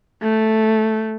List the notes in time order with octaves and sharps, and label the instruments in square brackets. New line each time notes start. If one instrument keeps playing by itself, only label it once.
[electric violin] A3